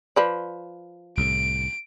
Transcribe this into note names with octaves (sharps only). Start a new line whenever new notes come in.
F3 B4 D5
C2 A2 D7